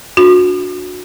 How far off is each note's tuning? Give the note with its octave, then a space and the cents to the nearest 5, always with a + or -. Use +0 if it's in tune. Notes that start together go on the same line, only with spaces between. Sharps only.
D4 +0 F#4 -30